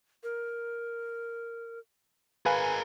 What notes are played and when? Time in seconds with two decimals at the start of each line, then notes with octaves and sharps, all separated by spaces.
0.23 A#4
2.46 G#4 A#4 B4 F5 G#5